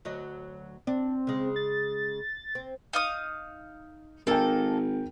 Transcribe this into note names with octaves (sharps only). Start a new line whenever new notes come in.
D2 F#3 D#5
C4 D4
C#3 G#3
A6
C4
D#4 F5 D#6
G#1 A#3 D#4 A4 A#4 G5